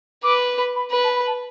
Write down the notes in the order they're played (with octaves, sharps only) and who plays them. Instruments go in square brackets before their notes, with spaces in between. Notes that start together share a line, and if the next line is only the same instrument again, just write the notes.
[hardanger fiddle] B4 [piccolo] D6
[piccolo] B5
B5
[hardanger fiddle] B4 [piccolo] B5
[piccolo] A5
B5
A5